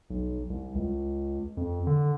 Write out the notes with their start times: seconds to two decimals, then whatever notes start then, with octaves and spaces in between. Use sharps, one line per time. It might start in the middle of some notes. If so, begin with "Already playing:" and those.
0.10 B1
0.50 C2
0.75 C#2
1.57 F2
1.87 D3